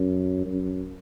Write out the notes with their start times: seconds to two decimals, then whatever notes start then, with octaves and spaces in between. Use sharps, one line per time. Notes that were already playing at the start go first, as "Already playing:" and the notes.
Already playing: F#2
0.46 F#2